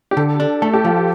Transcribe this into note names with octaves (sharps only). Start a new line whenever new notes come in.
G4
D3 A4
D4
A3 A4
G4
F3 F4
F4